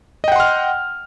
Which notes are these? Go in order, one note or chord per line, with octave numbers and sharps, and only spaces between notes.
D#5 F#5 G5 C6 F6